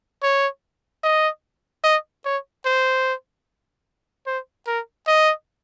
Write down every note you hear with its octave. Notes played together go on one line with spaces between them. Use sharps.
C#5
D#5
D#5
C#5
C5
C5
A#4
D#5